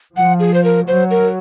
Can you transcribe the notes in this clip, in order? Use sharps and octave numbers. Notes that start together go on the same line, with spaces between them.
F3 F#5
G#4
C5
A#4
F#3 C5
A#4